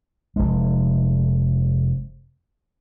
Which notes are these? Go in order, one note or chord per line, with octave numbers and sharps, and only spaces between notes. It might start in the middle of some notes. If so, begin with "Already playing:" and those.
F1 G#3